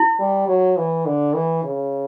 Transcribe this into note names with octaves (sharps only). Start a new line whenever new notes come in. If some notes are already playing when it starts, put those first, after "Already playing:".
Already playing: E4
G3
F#3
E3
D3
E3
C#3